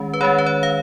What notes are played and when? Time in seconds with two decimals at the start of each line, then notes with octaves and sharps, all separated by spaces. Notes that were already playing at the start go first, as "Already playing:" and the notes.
Already playing: D#3 G#3 C#4
0.14 B4
0.21 D#3 G#3 C#4 C#5
0.38 B4
0.46 C#5
0.63 F5